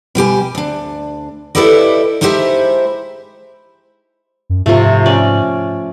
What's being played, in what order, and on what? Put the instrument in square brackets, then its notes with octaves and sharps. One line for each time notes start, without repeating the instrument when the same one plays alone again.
[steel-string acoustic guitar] B2 G3 G4 G#5
D2 D4
E4 G4 A4 B4 D5 D#5
G#3 D#4 E4 G4 C5 E5
[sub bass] F#2
[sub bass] G#2 [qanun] C3 F3 A3
[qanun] C#4 D5